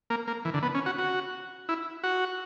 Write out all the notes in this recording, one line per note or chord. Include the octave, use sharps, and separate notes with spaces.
A#3
A#3
E3
D3
B3
C#4
F#4
F#4
E4
F#4